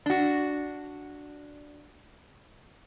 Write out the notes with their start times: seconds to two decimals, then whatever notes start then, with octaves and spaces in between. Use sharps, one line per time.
0.06 D4 F#4